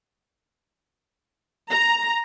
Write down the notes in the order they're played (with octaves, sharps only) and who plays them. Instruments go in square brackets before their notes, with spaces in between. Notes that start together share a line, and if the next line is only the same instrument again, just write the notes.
[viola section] A#5